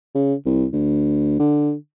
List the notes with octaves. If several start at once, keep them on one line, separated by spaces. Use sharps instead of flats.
C#3
C2
D2
D3